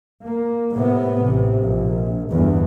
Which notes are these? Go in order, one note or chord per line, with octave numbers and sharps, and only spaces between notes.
A#3
A2 C3 B3
A1 C3
A#1
G1 E2